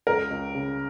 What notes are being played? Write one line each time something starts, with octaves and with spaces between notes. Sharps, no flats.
C#2 A#4
C#2
C#3